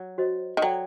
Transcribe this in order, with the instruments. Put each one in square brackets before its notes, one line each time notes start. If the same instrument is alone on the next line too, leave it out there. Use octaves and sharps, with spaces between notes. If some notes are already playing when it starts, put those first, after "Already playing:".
Already playing: [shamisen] F#3
[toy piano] F#4 C5 D#5
[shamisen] D#3
[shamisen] F#3 [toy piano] A4 D5 G5 A#5